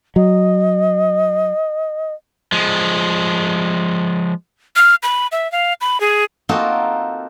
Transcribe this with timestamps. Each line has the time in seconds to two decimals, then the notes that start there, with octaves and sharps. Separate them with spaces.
0.16 F#3 D#5
2.52 F3 G#3
4.76 F6
5.03 B5
5.32 E5
5.52 F5
5.81 B5
6.01 G#4
6.49 A#3 C4 D#4 F4 F#4 A4